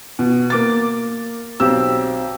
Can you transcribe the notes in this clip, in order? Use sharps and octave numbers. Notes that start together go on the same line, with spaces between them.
B2
A#3 D6 A6
B1 C4 G4 E6